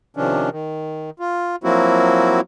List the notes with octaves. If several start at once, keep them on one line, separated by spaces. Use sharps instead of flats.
C3 D#3 F3 C#4 D4
D#3
F4
F3 F#3 A#3 C4 E4 F#4